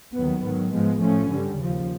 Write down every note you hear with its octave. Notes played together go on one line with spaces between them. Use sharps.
D#2 D#3 F#3 B3
G#2 D#3 F#3
G#2 F3 G#3 B3
A2 F3 A3 C#4
G2 D3 G3
D#2 C#3 F3